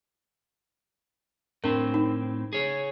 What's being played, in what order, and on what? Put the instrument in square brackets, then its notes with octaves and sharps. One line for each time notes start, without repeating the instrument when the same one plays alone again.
[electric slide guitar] A2 C4 [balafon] D4 A#4
[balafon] D#4
[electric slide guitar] G#4 C#5